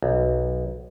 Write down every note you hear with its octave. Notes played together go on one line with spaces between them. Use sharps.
B1